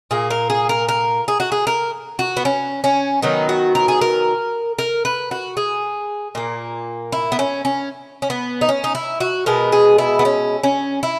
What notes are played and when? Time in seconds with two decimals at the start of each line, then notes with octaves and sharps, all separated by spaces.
0.11 A#2 A#3 G#4
0.31 A#4
0.50 G#4
0.69 A#4
0.89 A#4
1.28 G#4
1.40 F#4
1.52 G#4
1.67 A#4
2.19 F#4
2.37 B3
2.45 C#4
2.84 C#4
3.22 D#3 F#3 B3 D#4
3.49 F#4
3.75 A#4
3.88 G#4
4.01 A#4
4.79 A#4
5.05 B4
5.31 F#4
5.57 G#4
6.35 A#2 A#3
7.12 E4
7.32 B3
7.39 C#4
7.65 C#4
8.22 C#4
8.30 B3
8.61 D#4
8.69 C#4
8.84 D#4
8.95 E4
9.20 F#4
9.46 B2 G#3 B3 A#4
9.72 G#4
9.98 E4
10.19 B3
10.25 C#4
10.63 C#4
11.03 E4